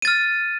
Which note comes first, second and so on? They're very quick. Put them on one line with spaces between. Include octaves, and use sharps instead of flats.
D#7 A6 F6